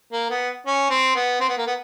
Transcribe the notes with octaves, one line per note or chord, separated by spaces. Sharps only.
A#3
B3
C#4
C4
B3
C4
B3
A#3
B3